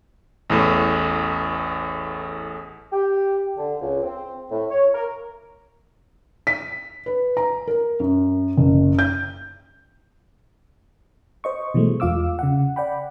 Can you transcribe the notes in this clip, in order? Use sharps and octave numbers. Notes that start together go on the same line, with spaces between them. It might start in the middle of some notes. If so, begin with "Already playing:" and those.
A1 E2 A2
G4
D3
C#2
C4
A2
C#5
A#4
B6
B4
A#5
A#4
F#2
F#1
G6
C5 D#5 C#6
B2 E3 F#3 G#3 A3
E2 F4 F5 D6 E6
C#3 F#5
D5 F#5 G5 B5